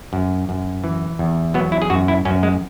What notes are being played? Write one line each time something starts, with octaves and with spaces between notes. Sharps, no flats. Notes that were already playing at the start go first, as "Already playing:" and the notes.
F#2
F#2
E3
E2
F#3 B3
E4
G#4
F#2 F#4
E4
F#2 C#4
G#3